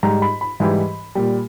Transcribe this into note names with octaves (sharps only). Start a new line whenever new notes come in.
G#2 G3 A#5
B5
B5
G#2 E3 G3
A#2 G3